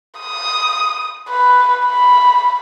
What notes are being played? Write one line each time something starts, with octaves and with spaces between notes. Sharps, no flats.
D#6
B4
B5